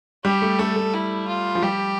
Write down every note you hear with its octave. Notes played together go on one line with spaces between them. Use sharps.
G3 G4
A3
A3 A4
A3
E4
F4
F3
G3 G4